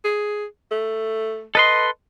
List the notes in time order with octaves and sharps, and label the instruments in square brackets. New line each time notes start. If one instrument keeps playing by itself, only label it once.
[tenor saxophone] G#4
A3
[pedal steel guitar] A4 B4 C6 [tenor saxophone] D#5